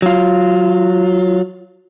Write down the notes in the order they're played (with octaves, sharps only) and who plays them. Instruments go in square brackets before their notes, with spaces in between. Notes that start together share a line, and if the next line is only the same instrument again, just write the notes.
[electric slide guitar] F#3 F4